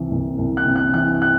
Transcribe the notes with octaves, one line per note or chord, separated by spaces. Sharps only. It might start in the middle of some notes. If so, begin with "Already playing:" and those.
Already playing: C2 C3 E3
C2
C2
F#6
C3
F#6
E3 F#6
F#6